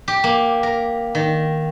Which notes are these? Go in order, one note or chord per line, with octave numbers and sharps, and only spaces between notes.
G4
A#3
A#4
D#3